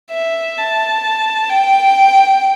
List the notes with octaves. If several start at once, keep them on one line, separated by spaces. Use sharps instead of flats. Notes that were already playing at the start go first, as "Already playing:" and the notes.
E5
A5
G5